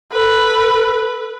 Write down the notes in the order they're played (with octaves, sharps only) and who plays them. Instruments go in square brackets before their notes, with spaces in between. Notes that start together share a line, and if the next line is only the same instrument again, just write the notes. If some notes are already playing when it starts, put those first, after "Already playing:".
[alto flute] A4 [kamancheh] B4